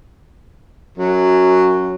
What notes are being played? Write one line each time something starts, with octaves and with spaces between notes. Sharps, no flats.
F#2 F#3